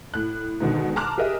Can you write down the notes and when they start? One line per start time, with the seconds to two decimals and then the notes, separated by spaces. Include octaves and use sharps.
0.14 A2 F#6
0.60 G#2 B2 D3 D#3
0.96 A5 A#5 C6 D6 F6 F#6
1.18 G4 G#4 A#4 D#5 E5